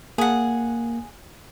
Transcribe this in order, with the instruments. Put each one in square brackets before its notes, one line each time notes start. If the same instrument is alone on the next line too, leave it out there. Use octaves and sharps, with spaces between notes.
[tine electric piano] A#3 [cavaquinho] G#4 F#5